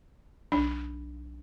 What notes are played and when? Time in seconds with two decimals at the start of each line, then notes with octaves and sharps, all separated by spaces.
0.52 B1 D4